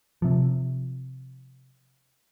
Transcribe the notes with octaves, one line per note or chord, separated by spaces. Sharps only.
C3 F3